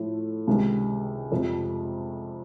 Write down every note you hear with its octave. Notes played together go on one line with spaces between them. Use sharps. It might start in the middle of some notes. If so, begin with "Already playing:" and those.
Already playing: A2 F3 A3
C#2 C3 D#3
F2 C3 F3